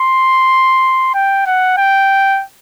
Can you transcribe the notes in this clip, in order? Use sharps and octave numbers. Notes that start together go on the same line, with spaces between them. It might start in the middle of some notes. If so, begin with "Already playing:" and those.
Already playing: C6
G5
F#5
G5